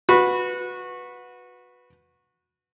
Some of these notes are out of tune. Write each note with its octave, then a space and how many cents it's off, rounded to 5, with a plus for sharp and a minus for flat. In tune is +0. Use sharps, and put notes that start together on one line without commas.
F#4 -20 B4 +0